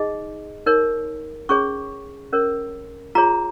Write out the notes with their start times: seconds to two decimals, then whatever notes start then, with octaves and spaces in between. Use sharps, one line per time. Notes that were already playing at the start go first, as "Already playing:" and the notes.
Already playing: D#4 G#4 D#5
0.66 D#4 A#4 C#5
1.49 C#4 G#4 C#5 C#6
2.32 C#4 A#4 C#5
3.15 F4 G#4 C#5 A#5